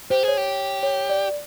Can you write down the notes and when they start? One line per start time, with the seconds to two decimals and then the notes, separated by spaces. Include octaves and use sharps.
0.10 G4 C5
0.23 G#4 C#5
0.37 G4
0.83 C#5
1.10 D5